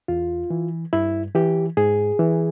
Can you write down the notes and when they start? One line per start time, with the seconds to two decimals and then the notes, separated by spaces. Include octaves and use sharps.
0.08 E2 F4
0.50 E3
0.93 G2 E4
1.35 E3 G4
1.77 G#2 G#4
2.19 E3